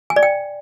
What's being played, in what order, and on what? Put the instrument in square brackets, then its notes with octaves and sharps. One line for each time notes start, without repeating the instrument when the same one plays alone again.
[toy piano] G#5
D5
G5